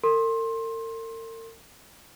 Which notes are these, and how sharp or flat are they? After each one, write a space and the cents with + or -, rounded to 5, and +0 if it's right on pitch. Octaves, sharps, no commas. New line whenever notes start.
A#4 -45 C6 +20